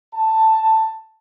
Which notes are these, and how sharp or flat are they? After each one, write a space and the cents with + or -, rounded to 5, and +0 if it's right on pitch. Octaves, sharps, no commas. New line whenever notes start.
A5 +10